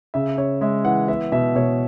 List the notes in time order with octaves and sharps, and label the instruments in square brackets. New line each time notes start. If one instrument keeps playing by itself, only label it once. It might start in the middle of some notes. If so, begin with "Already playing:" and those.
[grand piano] C#3 E5
C#3 C#5
G#3 E5
E3 F#5
B3 E5
B2 E5
B2 C#5